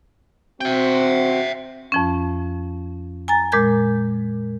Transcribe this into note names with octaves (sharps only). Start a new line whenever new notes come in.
C4 F#4 E5 G5
F2 F3 C#4
G#5 A#5 A6
A#2 G#3 A#4 G6 G#6